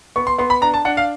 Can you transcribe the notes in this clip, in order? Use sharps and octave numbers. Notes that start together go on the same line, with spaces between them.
B3 C#6
C6
B3 C6
B5
D4 A#5
A5
D4 F#5
F5